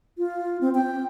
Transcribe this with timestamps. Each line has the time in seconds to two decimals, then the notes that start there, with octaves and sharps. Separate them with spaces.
0.18 F4
0.61 C4
0.75 G5